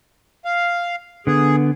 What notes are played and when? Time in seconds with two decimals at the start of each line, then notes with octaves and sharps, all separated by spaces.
0.45 F5
1.27 D3 B3 G#4